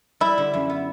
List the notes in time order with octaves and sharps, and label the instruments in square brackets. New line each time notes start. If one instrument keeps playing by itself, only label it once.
[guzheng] G3 [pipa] E4
[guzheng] D3
F#2
B3